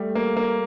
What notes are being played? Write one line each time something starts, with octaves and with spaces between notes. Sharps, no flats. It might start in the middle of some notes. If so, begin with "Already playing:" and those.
Already playing: G3 A3
A#3
A#3